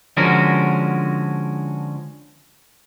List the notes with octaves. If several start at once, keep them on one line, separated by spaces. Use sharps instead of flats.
D3 F3 G#3 C#4 F#4 A#4